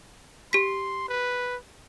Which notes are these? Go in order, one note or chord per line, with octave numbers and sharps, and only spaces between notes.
G4 C6 B6
B4